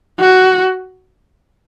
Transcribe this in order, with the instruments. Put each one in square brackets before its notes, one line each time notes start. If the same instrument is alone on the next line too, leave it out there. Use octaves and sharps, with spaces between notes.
[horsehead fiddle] F#4